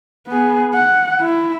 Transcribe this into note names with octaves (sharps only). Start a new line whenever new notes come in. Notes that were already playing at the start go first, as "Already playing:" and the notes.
B3 G#4
F#5
E4